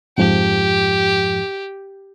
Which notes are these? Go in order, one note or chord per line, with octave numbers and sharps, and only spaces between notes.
F2 G#2 F3 G4